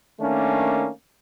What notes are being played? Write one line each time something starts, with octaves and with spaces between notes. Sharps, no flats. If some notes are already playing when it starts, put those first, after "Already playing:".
D#3 A3 A#3 C#4 D4